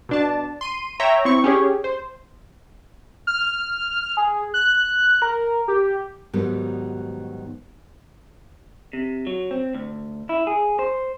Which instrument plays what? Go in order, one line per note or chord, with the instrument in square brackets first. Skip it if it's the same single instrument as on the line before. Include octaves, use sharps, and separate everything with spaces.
[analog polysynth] B2 D4 A5
C6 D#7
C#5 E5 G5 A#5
C4 E4 C#6
C#4 G4 G#4 C#5
C5
[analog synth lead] F6
G#4
F#6
A#4
G4
[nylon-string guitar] G#2 B2 D#3 F#3 G3 B3
[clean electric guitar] C3
F#3
C4
D2
E4
G#4
C5